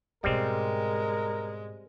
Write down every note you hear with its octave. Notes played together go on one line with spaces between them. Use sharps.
G#2 B2 G3 G#3 C4 A#4